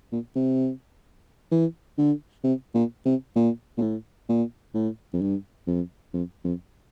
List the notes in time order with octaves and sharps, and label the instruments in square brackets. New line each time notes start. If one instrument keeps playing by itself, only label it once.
[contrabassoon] A#2
C3
E3
D3
C3
A#2
C3
A#2
A#2
A2
A#2
A2
F2
G2
F2
F2
F2